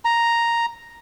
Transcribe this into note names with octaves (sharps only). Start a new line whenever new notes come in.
A#5